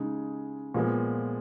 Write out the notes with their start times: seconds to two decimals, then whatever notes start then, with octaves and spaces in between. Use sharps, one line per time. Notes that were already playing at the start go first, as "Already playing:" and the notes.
Already playing: C#3 G#3 D#4
0.74 A#2 F3 G#3 B3